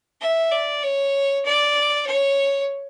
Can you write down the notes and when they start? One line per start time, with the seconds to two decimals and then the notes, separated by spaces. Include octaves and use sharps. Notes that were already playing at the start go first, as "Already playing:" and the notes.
0.21 E5
0.52 D5
0.83 C#5
1.45 D5
2.07 C#5